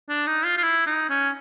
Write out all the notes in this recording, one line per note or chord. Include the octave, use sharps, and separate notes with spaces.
D4
D#4
F4
F4
E4
D#4
C#4